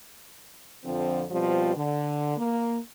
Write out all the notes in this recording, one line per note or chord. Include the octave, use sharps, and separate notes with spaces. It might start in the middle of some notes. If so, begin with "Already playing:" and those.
F2 D3 F3 C4
B2 F3 G3 C4 F4
D3
A#3